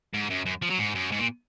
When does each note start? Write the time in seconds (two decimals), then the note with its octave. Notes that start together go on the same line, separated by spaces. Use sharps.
0.14 G#2
0.30 F#2
0.46 F#2
0.62 F3
0.70 F#3
0.78 G#2
0.95 F#2
1.11 G#2
1.19 A#2